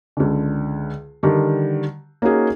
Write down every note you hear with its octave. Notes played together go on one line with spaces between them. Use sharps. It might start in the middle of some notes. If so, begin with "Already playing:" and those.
C#2 D3
D3 D#3 G3
A#3 C#4 D#4 F#4 G#4